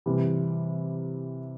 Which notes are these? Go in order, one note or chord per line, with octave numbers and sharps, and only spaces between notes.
C3 E3 G3